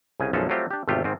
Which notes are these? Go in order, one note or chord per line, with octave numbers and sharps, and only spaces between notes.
C2 C#3 G#5
B1 F#2 F3 G#3 C#4 A4
F#3 G3 A3 C4 F4 G4
D4 G4
G#1 E2 C3 A3 F4 G4
G#2 D#3 C4